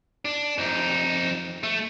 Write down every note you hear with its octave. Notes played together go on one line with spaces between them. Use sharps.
D4
F2 D#4
A3